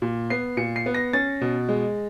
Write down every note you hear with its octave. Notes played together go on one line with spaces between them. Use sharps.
A#2
B3 C7
A#2 C#7
C7
B3
A#6
C#4 A6
B2
G#3